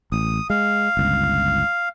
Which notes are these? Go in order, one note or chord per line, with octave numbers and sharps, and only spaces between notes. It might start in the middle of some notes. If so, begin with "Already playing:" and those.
A1 D#6
G#3 F5
G1 C#2